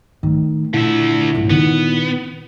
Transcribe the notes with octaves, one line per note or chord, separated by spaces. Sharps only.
A2 D#3
A#2 D3 E4 E5
G#1 F4
D#3 B3